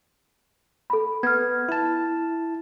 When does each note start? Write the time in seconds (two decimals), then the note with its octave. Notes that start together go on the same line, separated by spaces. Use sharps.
0.90 A4 B5
1.23 B3 F6 G#6
1.69 E4 A5